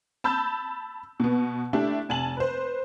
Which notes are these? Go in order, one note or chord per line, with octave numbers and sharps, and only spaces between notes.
A5 B5 E6 G6
B2 B3
A3 D4 E4 G4
F1 G#5 A5 F#7
B4 C5